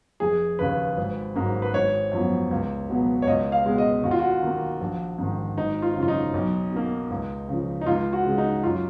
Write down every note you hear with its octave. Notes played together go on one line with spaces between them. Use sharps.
F1 G#4
D#2 C#3 B4
G#1
G#2 F#3 A#3
B4
G#1 C#5
F#2 F3 B3
C#2
B2 F#3 B3
C#5
C#2 D#5
F5
B2 G#3 B3
D#5
D#2 F#4
F4
F#4
D#3 A#3
A#1
G#2 D#3
G#1 D#4
F4
F#2 C#3
F4
D#4
B1
B2 A#3
C#2
C#3 F3
D#4
C#2 F4
F#4
C#3 G#3
D#4
F#2 F4